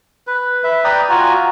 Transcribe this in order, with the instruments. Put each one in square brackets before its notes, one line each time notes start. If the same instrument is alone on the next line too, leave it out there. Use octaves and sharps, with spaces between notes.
[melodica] B4
B4 E5
D5 G5 A#5 D#6
F4 F#4 G#5 A#5